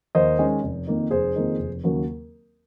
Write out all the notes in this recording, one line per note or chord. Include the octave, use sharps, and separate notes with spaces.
D#2 C5 D#5
D#3 G#3 C#4
F1
F2 D#3 A#3 D#4
F1 G#4 C5
F2 D#3 A#3 D#4
F1
D#2 C#3 F#3 A#3